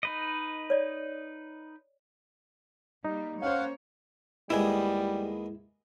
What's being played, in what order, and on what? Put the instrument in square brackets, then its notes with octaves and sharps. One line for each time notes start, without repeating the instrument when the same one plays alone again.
[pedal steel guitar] D#4 B4 D#5
[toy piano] C#5 D5
[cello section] G3 A#3 [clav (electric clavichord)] D#4
[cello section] A#3 C#5 [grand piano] C#4 C5 [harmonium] F5 F#5
[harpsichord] D#2 G#3 B3 [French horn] G3 [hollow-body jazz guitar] E4 G#4